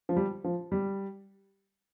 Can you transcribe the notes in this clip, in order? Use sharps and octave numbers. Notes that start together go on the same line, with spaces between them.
F3
G3
F3
G3